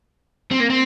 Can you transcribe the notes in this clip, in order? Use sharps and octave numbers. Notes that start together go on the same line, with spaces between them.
C4
A#3
C4